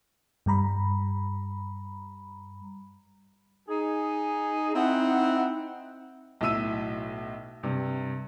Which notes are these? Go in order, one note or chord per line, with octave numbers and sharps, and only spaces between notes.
G2 G3 A#5 B5
D#4 G#4
C4 D#4 E4 F#5
B1 A2 E5 E6 D#7
G2 C3